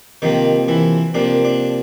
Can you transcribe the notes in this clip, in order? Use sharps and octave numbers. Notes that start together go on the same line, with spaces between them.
C3 D#3 F3 A#3 D#4
E3 E4
C3 F3 A#3 D4
D4